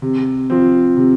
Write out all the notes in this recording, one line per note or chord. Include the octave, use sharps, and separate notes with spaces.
C3
F3 C4
C3